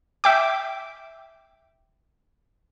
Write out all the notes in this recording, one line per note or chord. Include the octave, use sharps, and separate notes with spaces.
E5 G5 D6